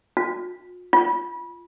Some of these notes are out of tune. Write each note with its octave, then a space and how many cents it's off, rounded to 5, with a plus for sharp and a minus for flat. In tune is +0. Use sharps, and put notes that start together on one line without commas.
F4 +40
F4 -15